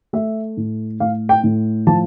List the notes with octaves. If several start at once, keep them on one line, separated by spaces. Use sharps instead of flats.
A3 E5
A2
A2 F5
G5
A2
F3 A5